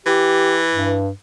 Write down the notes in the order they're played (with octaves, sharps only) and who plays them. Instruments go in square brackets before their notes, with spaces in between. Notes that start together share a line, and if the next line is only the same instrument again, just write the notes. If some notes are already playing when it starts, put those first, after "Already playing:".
[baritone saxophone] E3 [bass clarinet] G4
[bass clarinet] G2